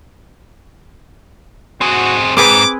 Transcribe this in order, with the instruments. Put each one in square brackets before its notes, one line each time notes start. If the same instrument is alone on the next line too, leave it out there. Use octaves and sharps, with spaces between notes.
[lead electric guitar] C4 G#4 [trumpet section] F#4
[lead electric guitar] G#2 [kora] C4 G#4 B4 [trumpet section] D6